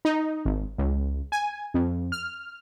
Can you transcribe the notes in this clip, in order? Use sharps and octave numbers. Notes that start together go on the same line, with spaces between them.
D#4
G#1
C#2
G#5
F2
F6